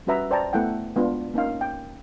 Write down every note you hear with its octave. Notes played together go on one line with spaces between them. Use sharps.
G3 C#4 F#4 B4 E5 A#5
C5 D5 G5 A5 A#5
A3 B3 E4 F#5 G5
G#3 B3 D4 F4
A#3 C#4 D#4 F5
G5